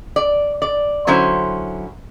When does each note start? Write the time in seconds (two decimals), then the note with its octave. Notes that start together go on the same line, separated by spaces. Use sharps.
0.16 D5
0.62 D5
1.07 D3 F#3 C#4 E4 C5